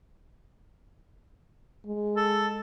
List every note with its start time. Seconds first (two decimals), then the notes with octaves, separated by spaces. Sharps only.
1.86 G#3
2.17 A4